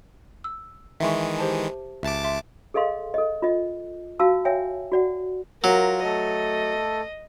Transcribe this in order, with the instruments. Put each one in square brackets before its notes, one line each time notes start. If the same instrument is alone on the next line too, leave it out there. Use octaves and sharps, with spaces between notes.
[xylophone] E6
[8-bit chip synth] D#3 E3 G#3 [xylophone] E5 C6 C#6
[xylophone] G4 C5 A5
[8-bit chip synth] C#2 A5 D6 [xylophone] E5
[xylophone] E5 C6
[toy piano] G#4 A4 D#5 F5 C6
A4 D#5
F4 D#5
F#4 F5 A5 E6
C#5 E5 G5 G#5
F#4 D5 F#5
[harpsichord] F#3 [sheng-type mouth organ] F4 [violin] A#4
[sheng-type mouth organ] A3 A4 [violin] D#5